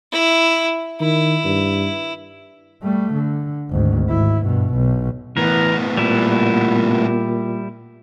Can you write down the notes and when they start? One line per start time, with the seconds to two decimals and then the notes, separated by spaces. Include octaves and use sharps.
0.12 E4
1.01 D#3 E4
1.45 G2
2.83 G3 A3
3.13 D3
3.70 G#1 D2
4.09 G#1 E4
4.44 G2 B2
4.74 B1
5.37 A2 E3 B3 A#4
5.98 A#2 G3 E4